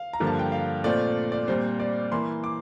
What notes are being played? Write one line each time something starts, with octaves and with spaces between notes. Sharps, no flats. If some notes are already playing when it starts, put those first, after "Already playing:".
Already playing: F5
A#5
G2 D3 F3 A#3
A5
G5
F5
A#2 A3 C4 F4 D5
D5
A#2 G3 C4 C5
D5
E3 A#3 E4 C6
D6